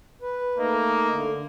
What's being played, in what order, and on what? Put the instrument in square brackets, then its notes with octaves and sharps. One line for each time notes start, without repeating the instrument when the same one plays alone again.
[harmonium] B4
[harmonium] A3 D#4 D#5 [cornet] A#3
[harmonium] D3